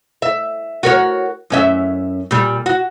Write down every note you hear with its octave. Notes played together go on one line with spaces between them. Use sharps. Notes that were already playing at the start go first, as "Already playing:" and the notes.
E5
F#4 A#4 C#5
F#2 C#4 E5
A#2 G3
F#4